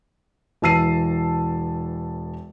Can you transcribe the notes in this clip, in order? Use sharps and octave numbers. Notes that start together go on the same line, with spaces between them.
E1 E3 A5 E6 C7 D#7